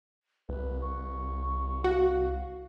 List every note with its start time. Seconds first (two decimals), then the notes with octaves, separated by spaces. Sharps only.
0.49 C2 B4
0.81 C#6
1.84 F#4 F5